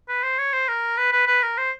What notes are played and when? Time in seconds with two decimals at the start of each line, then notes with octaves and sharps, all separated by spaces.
0.08 B4
0.23 C5
0.38 C#5
0.52 C5
0.68 A#4
0.97 B4
1.12 B4
1.27 B4
1.42 A#4
1.57 C5